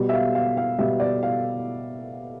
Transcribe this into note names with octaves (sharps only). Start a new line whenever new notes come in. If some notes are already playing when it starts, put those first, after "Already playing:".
Already playing: B2 G3
E5
F5
F5
F5
B2 G3 E5
D5
F5